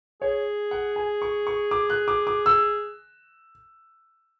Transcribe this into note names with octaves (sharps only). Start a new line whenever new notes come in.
G#4 C#5
F#5
G#5
C#6
C#6
D6
F#6
D6
D6
E6